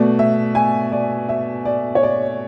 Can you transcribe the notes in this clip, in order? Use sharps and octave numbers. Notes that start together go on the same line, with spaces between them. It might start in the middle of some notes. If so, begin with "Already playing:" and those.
Already playing: B2 A3 D5
E5
G#5
D5
E5
D5
C#5
D5